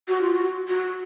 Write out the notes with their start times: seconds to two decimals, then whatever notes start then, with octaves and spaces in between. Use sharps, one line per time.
0.08 F#4
0.21 F4
0.34 F#4
0.68 F#4